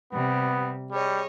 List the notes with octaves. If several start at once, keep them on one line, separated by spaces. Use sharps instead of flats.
C3 G3 B3
G3 G#4 C#5 D#5